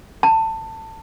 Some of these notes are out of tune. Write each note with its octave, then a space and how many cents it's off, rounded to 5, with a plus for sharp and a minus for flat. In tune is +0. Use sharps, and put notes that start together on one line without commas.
A5 +20